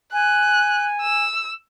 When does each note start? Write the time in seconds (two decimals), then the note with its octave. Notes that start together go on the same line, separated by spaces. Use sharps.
0.13 G#5 F#6
1.01 E6